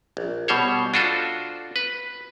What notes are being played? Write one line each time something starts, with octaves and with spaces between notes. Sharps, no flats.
A#1
B2 G3 C5 C#5
D4 F4 F#4 A4 C5
B4